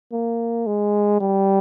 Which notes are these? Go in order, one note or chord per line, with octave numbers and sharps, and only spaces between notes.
A#3
G#3
G3